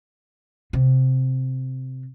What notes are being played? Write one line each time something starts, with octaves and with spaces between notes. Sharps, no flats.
C3